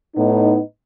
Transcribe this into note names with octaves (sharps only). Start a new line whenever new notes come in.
A2 B3 D#4